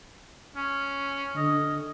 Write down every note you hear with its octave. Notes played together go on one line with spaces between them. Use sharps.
C#4
D3 D#5